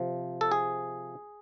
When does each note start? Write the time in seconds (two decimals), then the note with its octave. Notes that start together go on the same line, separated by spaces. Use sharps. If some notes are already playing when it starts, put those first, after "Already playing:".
Already playing: C3 F3
0.41 A4
0.52 G#4